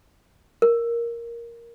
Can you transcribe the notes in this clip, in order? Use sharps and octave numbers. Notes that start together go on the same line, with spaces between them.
A#4